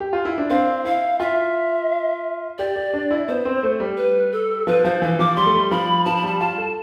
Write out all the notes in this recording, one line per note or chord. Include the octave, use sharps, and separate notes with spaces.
G4
F4
E4
D4
C4 F5
E4 F5
F4 E5
G4 D5
G4
D4
E4
B3 C5
C4
A3
G3
B4
A4
F3 B4
F3 C5
E3 F5
F3 D6
G3 C6
A3
G3
F3 B5
F3 A5
B5
G3 A5
F4 A5
A4